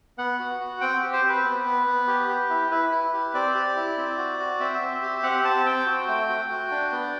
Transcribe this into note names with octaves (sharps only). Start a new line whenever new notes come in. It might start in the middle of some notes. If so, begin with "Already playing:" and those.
B3 F#5
F#4
F#4
C4 G5
G4
C5
C4
B4
B3
B3
B3
G4
G4
E4
E4 B4
E4
G4
C4 D5
G4
E4
C4
F#4
F#4
C4 E5
C4
G4
C4 F#5
C4 A5
C4 G5
F#4
A3
F#4
F#4
D4
B3